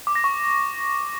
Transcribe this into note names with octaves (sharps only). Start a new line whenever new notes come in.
D6
A#6
C#6